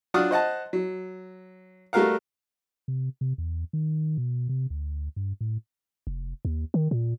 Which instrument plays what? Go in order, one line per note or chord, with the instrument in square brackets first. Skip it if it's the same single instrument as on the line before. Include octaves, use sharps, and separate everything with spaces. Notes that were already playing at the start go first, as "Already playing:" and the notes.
[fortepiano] F#3 D4 F4 F#5 D#6 F6
C5 D#5 F#5 A5
F#3
G3 A3 F#4 A#4 F5 F#5
[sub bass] C3
C3
E2
D#3
B2
C3
D2
G2
A2
F1
D#2
D#3
A#2